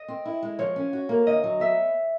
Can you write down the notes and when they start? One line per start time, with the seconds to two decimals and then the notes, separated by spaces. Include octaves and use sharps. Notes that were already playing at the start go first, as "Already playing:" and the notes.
Already playing: D#5
0.08 C4
0.25 E4
0.43 G#3
0.59 F3 C#5
0.76 C#4
0.93 F#4
1.09 A#3
1.27 D2 D#5
1.44 F#3
1.60 B3 E5